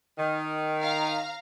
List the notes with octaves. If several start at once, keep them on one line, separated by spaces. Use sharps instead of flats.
D#3
F5 A#5